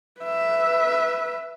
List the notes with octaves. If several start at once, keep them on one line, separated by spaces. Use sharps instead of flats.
B4 E5